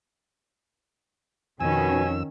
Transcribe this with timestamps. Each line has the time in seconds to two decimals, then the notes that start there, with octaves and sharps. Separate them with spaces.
1.60 F2 B2 D#3 C#4 G#5 E6